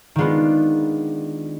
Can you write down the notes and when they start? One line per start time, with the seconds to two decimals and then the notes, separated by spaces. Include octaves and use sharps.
0.16 D#3 G#3 B3 D4 F4